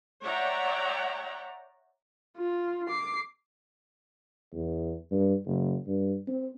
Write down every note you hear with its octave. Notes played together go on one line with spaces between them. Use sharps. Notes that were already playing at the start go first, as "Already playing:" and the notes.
C#5 D5 E5 F#5 G5 A#5
F4
D6 C7
E2
G2
F#1
G2
C4